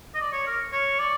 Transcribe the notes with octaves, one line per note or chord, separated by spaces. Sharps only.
D#5
D5
C#5
A#4
C#5
D5